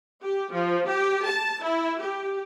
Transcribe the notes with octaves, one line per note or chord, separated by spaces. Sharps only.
G4
F3
G4
A5
E4
G4